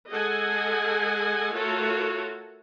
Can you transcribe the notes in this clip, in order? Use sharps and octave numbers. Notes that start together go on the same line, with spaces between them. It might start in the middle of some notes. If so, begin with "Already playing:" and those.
G#3 G#4 A4 D#5 F#5 G#5
A3 F4 F#4 A4 A#4 C#5